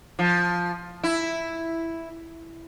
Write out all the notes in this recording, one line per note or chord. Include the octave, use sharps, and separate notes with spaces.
F3
E4